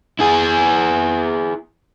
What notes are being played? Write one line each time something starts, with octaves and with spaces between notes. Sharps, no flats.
E4 G#4